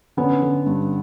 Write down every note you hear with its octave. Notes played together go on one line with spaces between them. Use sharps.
D3 B3 C#4
D3
G2